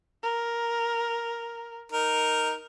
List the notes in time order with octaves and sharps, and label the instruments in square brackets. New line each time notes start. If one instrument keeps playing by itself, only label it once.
[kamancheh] A#4
[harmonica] D#4 A#4